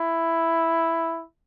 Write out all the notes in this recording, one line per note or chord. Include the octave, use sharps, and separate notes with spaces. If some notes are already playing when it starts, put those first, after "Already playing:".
Already playing: E4